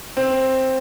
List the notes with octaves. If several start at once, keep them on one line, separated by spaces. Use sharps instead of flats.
C4